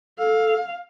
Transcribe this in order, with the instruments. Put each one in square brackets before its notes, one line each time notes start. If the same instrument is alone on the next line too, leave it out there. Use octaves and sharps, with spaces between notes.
[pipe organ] A4 [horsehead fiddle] F5